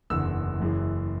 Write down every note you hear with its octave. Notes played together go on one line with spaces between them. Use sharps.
F#1 E2 D3 E6
F#1 F#2 C#3 E3